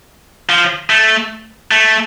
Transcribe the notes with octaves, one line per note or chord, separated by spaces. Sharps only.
F3
A3
A3